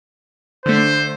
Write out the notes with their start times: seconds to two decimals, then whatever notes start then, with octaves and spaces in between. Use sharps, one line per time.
0.66 D3 A3 C5